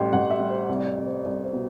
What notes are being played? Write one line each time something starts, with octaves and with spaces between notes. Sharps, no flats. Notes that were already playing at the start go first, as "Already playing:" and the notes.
Already playing: A1 G3 G5 C6
A1 F#5
E5
G3
C5
C2 D5
D5
C2
C5
C2 D5
C5
B2